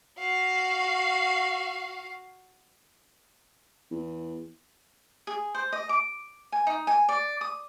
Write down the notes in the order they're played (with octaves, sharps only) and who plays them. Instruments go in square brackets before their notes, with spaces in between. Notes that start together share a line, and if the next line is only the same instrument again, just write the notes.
[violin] F#4 F5
[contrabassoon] E2
[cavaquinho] G#4
C5
D#5
D6
G#5
D#4
G#5
D5
D#6